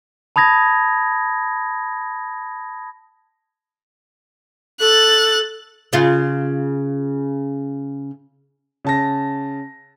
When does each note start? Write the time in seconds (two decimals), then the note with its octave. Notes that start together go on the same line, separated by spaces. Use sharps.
0.36 A5 B5 D#6 G#6 A#6
4.81 A4 F#6 A6
5.93 C#3 F4
8.85 C#3 A5 A#6